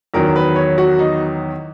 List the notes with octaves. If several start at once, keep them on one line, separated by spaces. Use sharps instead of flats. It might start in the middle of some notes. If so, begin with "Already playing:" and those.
E2 D#3 F#3 A#4
B4
C#5
F#4
D#4